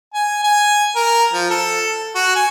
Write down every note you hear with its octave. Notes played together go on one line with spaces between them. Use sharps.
G#5
G#5
A#4
F3
A4
F#4
G#5